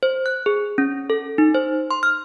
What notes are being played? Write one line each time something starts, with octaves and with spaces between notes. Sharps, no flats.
C5
F#6
G#4
C#4
A4
D#4
C5
C6
F6